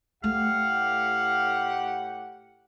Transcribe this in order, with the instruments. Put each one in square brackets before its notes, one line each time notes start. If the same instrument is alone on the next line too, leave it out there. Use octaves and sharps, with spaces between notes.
[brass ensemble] A2 G4 F#5 [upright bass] A3 [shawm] F5